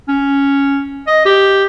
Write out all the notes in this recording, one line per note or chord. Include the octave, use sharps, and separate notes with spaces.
C#4
D#5
G4